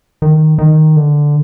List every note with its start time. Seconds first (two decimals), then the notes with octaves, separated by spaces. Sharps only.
0.22 D#3
0.58 D#3
0.97 D3